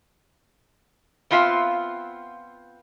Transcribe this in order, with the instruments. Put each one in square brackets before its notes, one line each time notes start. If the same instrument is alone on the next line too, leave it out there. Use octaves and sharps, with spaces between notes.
[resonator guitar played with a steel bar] B3 C4 F4 E5 F5